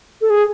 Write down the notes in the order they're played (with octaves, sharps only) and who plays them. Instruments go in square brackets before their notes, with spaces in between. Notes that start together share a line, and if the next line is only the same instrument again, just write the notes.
[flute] A4
G#4